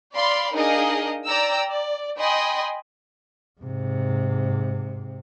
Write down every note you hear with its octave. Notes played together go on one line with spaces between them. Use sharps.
D5 F5 B5 C6
D4 D#4 G#4 A#4 D#5 F5
D5 G5 A#5 E6
D5
D#5 G5 G#5 B5 C6
G#2 C3